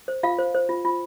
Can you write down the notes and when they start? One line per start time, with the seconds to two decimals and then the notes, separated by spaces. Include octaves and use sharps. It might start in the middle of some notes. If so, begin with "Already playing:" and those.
0.08 C5
0.23 F4 F5
0.39 C5
0.55 C5
0.69 F4
0.85 F4